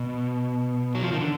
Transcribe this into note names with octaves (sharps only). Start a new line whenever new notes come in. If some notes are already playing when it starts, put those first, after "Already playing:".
Already playing: B2
F#3
F3
D#3
D3